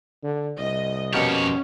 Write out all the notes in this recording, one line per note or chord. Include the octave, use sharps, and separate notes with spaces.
D3
C2 D#5
F2 B2 A#3 C#4 G4 C#5